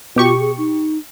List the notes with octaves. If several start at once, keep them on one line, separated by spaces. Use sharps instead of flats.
B2 F4 G4 C#6
G#4
D#4